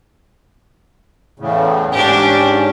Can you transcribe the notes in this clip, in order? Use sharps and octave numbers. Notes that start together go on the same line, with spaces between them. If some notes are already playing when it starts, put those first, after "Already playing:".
E2 A2 C#3
G#2 C#4 D4 G4